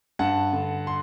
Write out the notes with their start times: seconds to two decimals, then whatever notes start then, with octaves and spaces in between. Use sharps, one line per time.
0.19 G2 F#5 A5
0.53 D3
0.87 C6